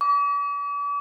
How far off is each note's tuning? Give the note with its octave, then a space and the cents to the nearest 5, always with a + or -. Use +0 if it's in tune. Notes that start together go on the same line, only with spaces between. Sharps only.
D6 -40